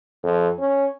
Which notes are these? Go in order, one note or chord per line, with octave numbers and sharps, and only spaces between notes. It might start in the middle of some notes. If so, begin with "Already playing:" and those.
F2
C#4